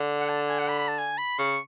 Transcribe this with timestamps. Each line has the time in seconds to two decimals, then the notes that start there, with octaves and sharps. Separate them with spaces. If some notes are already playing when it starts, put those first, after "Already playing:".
Already playing: D3
0.19 F#5
0.29 A5
0.49 G#5
0.58 F#5
0.68 B5
0.79 B5
0.88 A5
0.98 G#5
1.18 B5
1.39 C#3 C#6